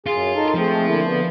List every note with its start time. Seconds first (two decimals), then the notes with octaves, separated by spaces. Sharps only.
0.06 F#2 F4 G#4
0.34 D#4 A4 A#4
0.55 F3 G#3 A3 C4
0.86 D3 A#3 E4
1.06 D3 B3